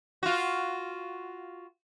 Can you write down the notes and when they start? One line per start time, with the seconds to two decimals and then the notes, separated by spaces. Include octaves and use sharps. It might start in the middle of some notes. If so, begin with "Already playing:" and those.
0.23 F4 F#4